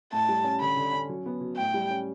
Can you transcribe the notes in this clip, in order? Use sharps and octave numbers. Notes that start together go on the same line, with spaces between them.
A2 A5
G3
C#4
D3 B5
D3
C#4
F#3
B3
F#3
A2 G5
G3
C#4